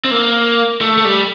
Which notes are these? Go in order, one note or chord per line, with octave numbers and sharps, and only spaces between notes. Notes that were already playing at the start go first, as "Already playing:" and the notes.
C4
A#3
A3
A3
G3